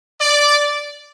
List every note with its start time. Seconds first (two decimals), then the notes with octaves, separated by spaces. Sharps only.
0.20 D5